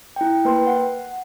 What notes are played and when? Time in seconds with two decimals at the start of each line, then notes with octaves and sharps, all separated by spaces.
0.16 E4 G5
0.45 A#3 B4 G5 C6
0.67 F#5